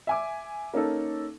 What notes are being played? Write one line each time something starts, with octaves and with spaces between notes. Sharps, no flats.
E5 G#5 D6
A#3 C#4 D#4 A4